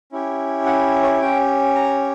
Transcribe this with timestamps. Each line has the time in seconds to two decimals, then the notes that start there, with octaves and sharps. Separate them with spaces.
0.12 C#4 E4 G4
0.66 F#5
1.03 C#5
1.21 C#4 G4 G5
1.75 A#5